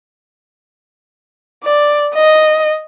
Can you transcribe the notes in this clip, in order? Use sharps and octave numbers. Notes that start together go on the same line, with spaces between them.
D5
D#5